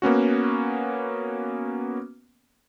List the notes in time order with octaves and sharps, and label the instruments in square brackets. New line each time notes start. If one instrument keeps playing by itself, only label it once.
[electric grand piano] A#3 B3 C#4 F#4